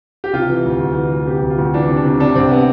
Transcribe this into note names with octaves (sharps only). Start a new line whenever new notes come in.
G4
C3 F4
E3
D2
D2
E3
D2
C3 G4
D2
F4
D2
E3 D4
C3
D4
C3
C3 D4
C2 C4
B3